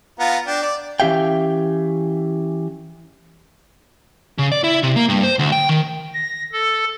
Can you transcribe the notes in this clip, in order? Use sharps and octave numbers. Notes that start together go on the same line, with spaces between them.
B3 F4 A#5
D4 G5
D5
E3 C#4 G4 E5 F5 G5
C#3
D5
E4
C3
A#3
G2
C5
D2
G5
D#3
A#6
A4